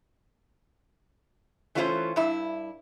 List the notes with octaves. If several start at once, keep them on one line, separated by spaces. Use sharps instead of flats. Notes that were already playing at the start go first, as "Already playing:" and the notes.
E3 A3 C#4 F4 A4 C5
G2 E4